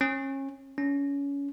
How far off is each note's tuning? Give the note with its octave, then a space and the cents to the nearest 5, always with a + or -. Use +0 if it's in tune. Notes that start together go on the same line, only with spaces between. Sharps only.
C#4 -30
C#4 +25